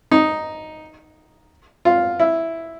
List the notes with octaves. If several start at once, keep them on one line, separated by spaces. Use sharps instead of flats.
D#4
F4
E4